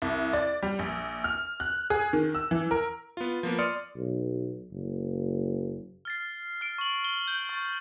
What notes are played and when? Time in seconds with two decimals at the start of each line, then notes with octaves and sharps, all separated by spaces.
0.02 C2
0.33 D5
0.63 G3
0.79 A#1
1.24 F6
1.60 F#6
1.90 G#4
2.13 D#3
2.35 E6
2.51 E3
2.71 A#4
3.17 B3 F4
3.43 F3 A#3 B3
3.59 D5 C6 D#6 F6 C#7
3.97 B1
4.71 F#1
6.05 F6 A6 C7
6.61 F6 D7
6.78 C#6 F#7
7.04 G7
7.28 G6
7.49 C#6 A6